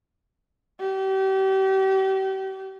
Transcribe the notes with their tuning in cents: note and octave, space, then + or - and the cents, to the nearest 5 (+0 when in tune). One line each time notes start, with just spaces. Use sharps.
G4 -35